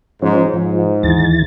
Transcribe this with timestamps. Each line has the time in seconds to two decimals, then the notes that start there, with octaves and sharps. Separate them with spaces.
0.22 G#2 F3 C#4
0.54 G#2 F3
1.03 D#2 E3 A6